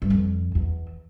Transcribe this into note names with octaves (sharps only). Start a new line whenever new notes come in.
G2
F2
E2